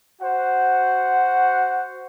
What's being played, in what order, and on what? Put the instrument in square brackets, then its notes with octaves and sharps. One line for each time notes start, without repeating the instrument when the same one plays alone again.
[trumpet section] F#4 C5 F#5